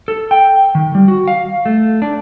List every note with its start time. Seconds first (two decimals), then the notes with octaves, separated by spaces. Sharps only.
0.08 A4
0.31 G5
0.75 D#3
0.95 G3
1.08 F#4
1.28 F5
1.66 A3
2.02 D4